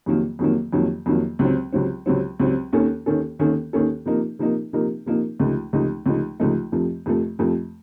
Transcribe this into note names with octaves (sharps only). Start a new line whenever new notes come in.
F2 C3 D#3 F#3 A#3
F2 C3 D#3 F#3 A#3
F2 C3 D#3 F#3 A#3
F2 C3 D#3 F#3 A#3
C#2 C3 F#3 C4
C#2 C3 F#3 C4
C#2 C3 F#3 C4
C#2 C3 F#3 C4
D#2 D#3 A#3 C#4 A4
D#2 D#3 A#3 C#4 A4
D#2 D#3 A#3 C#4 A4
D#2 D#3 A#3 C#4 A4
C3 F3 A#3 D#4 A#4
C3 F3 A#3 D#4 A#4
C3 F3 A#3 D#4 A#4
C3 F3 A#3 D#4 A#4
C#2 C3 F3 A3 D#4
C#2 C3 F3 A3 D#4
C#2 C3 F3 A3 D#4
C#2 C3 F3 A3 D#4
F2 C3 F3 A3
F2 C3 F3 A3
F2 C3 F3 A3